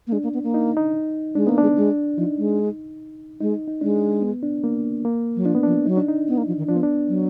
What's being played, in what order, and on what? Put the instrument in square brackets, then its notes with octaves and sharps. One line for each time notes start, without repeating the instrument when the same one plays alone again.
[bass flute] A#3
[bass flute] G#3 [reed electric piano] D4
[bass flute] A#3
B3
A#3
[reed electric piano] D#4
D#4
[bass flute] G#3 [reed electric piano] D4
[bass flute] A#3 [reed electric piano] B3
[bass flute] G#3 [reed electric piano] D4
[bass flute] G#3
[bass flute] F3 [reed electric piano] D#4
[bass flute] G#3
[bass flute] G#3 [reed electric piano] D#4
[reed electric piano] D#4
[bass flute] G#3 [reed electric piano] D4
[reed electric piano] B3
D4
A#3
A#3
[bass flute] F#3
[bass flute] F3 [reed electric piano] D4
[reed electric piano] B3
[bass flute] F3 [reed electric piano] D4
[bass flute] F#3 [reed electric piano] D#4
[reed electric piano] D4
D#4
[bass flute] B3
A#3
F3
D#3
[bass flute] F3 [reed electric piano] D4
[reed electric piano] B3
D4
[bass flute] F#3